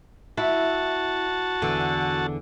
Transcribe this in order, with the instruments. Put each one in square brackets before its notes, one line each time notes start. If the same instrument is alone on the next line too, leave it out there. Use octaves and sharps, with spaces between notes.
[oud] E4 [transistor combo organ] F#4 A5
[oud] E2 D3